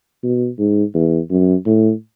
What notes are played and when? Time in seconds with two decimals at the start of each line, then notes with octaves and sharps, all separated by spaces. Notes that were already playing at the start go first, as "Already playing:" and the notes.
0.23 B2
0.59 G#2
0.94 E2
1.30 F#2
1.66 A2